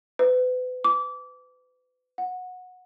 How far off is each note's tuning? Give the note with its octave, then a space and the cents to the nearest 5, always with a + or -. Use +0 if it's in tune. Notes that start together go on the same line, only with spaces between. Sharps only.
B4 +35
D6 -25
F#5 -20